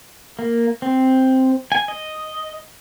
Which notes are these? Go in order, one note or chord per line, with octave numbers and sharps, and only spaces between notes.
A#3
C4
G#5
D#5